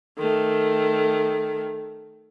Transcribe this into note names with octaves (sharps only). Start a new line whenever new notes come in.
D#3 A3